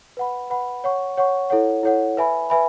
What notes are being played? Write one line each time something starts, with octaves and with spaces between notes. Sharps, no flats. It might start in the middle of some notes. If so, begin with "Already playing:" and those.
B4 F#5 B5
B4 F#5 B5
C#5 F#5 C#6
C#5 F#5 C#6
E4 A4 C#5 F#5
E4 A4 C#5 F#5
B4 E5 G#5 B5
B4 E5 G#5 B5